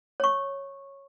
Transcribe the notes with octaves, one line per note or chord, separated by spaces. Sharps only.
C#5 C#6